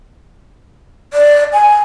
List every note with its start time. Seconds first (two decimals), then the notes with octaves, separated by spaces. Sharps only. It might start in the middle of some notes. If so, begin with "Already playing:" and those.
1.13 D5
1.53 G#5